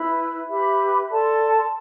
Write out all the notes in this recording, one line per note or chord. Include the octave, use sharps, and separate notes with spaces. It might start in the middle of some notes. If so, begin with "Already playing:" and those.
Already playing: E4 B4 E5
G4 B4 E5 B5
A4 D5 A5 C6